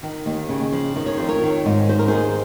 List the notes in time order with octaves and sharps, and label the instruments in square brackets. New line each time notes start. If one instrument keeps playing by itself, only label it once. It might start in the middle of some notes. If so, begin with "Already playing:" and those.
[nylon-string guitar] D#3
D#2
C#3
F3
D#3
C#5
F2 C5
A#4 C#5
D#3
G#2
D#3 C5
A#4
D#2 G#4 C5